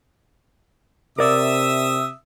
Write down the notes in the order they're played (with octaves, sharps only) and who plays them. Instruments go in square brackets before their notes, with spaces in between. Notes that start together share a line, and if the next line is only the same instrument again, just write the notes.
[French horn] C3 [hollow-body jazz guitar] A#4 D5 [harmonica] E5 D#6 E6